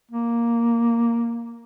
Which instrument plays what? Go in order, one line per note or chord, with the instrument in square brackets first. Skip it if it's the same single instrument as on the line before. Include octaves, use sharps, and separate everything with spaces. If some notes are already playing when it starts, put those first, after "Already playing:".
[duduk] A#3